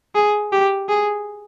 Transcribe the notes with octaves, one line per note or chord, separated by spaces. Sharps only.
G#4
G4
G#4